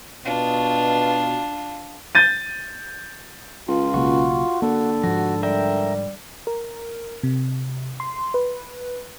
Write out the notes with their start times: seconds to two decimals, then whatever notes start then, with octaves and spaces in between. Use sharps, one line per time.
0.25 B2 D4 F4
2.15 G6 A6 D#7
3.68 C#2 F4
3.94 B1 C#3 A#3 F#4
4.62 D3 A#3 A4
5.04 G#2 F3 F#4
5.43 G3 A#4 E5 G5
6.47 A#4
7.23 C3
8.00 C6
8.34 B4